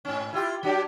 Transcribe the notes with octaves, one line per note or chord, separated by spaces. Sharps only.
G#2 C#4
E4 F4 G4
F#3 D4 G4